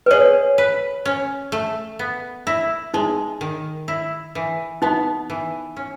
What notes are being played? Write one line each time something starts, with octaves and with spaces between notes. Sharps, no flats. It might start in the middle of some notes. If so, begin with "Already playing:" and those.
B4
G#4 C#5
B4
C#4
A3
B3
E4
G#3 D#4
D#3
E4
E3
B3 D#4
E3
C#4